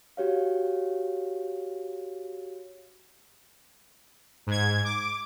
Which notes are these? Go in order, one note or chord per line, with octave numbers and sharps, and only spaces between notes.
F#4 G4 C#5 F5
G#2 G#6
D6